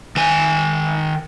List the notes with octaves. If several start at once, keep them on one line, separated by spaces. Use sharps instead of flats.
D#3 G#5